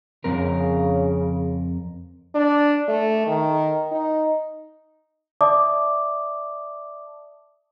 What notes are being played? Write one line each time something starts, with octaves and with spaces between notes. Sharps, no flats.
F2 C#3 C4 A#4
D4
A3
D#3
D#4
D5 E5 A5 D6 D#6